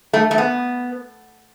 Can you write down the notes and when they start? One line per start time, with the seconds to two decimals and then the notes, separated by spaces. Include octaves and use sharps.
0.13 A3
0.31 A3
0.38 B3